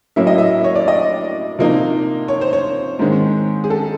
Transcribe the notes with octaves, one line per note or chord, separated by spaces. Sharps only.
A2 F#3 A#3 C#4 E5
D#5
E5
C#5
D5
D#5
C3 F3 A#3 D#4
C#5
C5
C#5
G#2 D#3 G#3 C4
G#4
A4